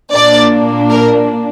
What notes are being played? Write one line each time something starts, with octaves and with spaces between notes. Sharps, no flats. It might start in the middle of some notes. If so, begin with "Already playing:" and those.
A#2 A#3 D4 D5
A#4